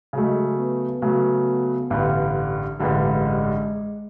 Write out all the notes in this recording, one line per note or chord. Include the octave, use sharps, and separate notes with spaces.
C#3 F#3 G#3 A3
B3
C#3 F#3 A3
A1 G2 D3 G3
A1 G2 D3 G3 G#3